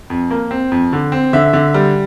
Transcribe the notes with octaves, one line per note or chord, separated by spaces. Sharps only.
F2
A#3
C4
F2
D3
C4
D3 E5
D3
G3